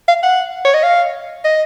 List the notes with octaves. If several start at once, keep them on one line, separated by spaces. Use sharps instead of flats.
F5
F#5
C#5
D#5
F5
D#5